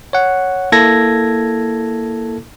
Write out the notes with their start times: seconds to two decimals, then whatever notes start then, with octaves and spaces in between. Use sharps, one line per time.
0.13 C#5 F#5
0.72 A#3 E4 A4 G#6 A#6